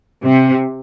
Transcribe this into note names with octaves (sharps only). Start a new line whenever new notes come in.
C3